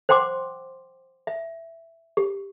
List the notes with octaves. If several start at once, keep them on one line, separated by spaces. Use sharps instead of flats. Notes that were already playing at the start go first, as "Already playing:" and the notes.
C5 F#5 G5 C6 D6
E5
G4